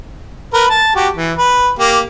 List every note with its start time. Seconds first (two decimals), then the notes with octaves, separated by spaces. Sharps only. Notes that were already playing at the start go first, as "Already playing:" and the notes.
0.54 A#4 B4
0.70 A5
0.96 F#4 G4
1.14 E3
1.38 B4
1.79 A#3 G4